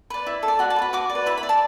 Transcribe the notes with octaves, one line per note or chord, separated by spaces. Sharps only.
B4 D5
E4
A4
D5
F#4 F#5
A5
B4 D5
B5
F#4 D6
D5
B4
E4 B5
B5
D5
A5